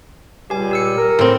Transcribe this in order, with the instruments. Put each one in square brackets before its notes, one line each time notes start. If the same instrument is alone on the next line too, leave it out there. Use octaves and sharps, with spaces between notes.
[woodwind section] C#2 A#2 G3 [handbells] G4 G#5
[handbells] G4 E6 C#7
[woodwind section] A#4
[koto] A2 C4